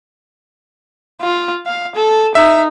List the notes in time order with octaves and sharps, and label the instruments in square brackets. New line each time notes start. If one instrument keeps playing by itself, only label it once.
[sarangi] F4
F5
A4
[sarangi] D#4 [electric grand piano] E5